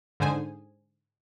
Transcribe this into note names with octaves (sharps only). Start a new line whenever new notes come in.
G#2 D3 G#4 C5 G#5